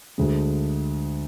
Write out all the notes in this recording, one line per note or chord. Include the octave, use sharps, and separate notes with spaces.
D2 D3 G#3